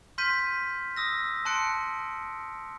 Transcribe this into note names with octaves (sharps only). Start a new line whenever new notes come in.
C6 F6 G6 B6 D#7
D#6 E6 A#6
A5 C6 F#6 C#7 D7